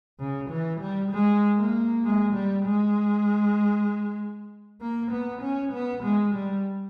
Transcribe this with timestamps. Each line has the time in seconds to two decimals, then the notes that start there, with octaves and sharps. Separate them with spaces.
0.19 C#3
0.50 E3
0.80 G3
1.11 G#3
1.57 A#3
2.04 G#3
2.34 G3
2.65 G#3
4.81 A#3
5.11 B3
5.42 C#4
5.72 B3
6.03 G#3
6.34 G3